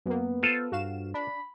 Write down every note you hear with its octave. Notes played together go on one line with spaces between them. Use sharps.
F#2 A#3 B3
F4 A4 C5
G2 F#4 F5 E7
D4 B5